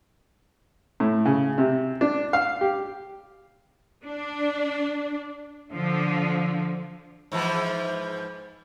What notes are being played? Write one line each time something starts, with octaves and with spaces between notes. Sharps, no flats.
A2
C#3
C3
D4
F5
G4
D4
D3 F3
G#2 E3 F3